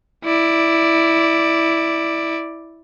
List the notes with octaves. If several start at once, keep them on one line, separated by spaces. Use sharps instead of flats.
E4 D5